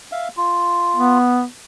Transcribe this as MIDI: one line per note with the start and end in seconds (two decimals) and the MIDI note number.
0.12 0.28 76
0.12 0.28 77
0.37 1.18 65
0.96 1.45 59